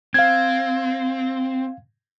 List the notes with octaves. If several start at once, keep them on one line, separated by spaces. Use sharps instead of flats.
C4 F5 G#6